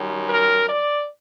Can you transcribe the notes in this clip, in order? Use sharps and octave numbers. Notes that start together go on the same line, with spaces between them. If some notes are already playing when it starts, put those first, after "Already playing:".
Already playing: F#2 D#3 G3
A#4
D5